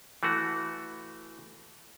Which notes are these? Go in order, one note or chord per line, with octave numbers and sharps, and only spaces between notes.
E3 A3 F#4